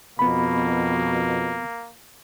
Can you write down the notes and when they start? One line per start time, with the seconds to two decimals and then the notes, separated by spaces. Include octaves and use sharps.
0.19 F2 B2 A#3 B3 B5